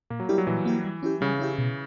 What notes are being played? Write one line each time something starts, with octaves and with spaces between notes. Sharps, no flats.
A#2 A#3
F#3
G3 A#3 E4 G4
F#3
A#2 E3
A#3 E4 G4
G3
C#4 E4 G4
C#3 G3
C#4 E4 G4
B2